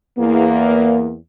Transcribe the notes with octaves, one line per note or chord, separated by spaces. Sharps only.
E2 A#3